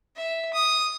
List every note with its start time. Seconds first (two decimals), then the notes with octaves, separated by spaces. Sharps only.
0.16 E5
0.54 D#6